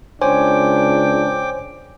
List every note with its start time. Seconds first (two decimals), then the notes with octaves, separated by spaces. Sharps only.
0.22 C#2 D4 C5 C#5 G5 G#5 D6